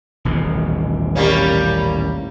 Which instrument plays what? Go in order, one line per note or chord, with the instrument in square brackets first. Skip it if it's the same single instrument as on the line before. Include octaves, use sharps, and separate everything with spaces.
[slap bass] D#1 A1 B2
[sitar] G3 A#3 C#4